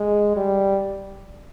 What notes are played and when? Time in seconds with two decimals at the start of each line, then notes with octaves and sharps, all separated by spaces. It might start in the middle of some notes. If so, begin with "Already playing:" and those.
Already playing: G#3
0.36 G3